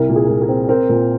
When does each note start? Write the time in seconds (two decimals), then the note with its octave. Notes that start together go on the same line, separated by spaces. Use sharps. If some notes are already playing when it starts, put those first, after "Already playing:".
Already playing: C2 A#4
0.09 A#2
0.16 G#4
0.29 A#2
0.42 G#4
0.48 C4
0.69 C4 A#4
0.89 A#2